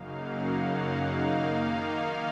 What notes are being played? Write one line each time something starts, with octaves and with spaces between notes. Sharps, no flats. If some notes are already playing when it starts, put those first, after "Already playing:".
Already playing: F#2 C#3 F#3 A#3 D#4 F5
F#5
D#3 A#3 D#4 F5